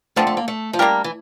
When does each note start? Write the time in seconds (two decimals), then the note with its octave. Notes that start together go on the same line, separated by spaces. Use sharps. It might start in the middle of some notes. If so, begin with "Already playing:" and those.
0.16 D3 F3 A3 C4
0.27 A3
0.37 A#3
0.48 A3
0.73 F3
0.79 G3 A#3 D4 G4 A#4
1.04 E3